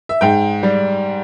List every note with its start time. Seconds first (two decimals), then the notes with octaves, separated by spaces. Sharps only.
0.09 E5
0.21 G#2 G5
0.63 G3